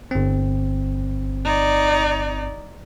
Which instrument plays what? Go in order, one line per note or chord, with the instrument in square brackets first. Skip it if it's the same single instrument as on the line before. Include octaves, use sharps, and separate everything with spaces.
[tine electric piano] G1 C4
[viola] D#4 D5